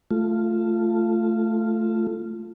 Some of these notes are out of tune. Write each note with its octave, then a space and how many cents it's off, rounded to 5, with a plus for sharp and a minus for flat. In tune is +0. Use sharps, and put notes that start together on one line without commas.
A3 +0 F4 -10